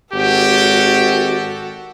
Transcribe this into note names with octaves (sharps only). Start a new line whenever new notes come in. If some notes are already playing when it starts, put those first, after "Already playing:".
G#1 F#4 G4 A4